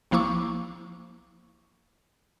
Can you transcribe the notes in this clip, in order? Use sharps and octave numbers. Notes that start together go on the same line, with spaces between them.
B1 F3 A#3 E4 C#6 D6